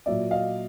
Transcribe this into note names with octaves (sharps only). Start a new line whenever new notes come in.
A#2 F#3 A#3 D5 E5
D#5 F5